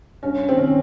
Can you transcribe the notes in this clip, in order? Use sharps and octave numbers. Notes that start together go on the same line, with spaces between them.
G2 C#4
D#3 C4
C#4